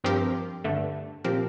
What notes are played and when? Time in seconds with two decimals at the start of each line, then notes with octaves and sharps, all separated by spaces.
0.04 G2 F3 C4 G4 A#4
0.64 G2 D3 A3
1.24 A#2 F3 C4 G4 A#4